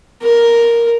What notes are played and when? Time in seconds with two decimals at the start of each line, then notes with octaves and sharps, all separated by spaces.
0.23 A#4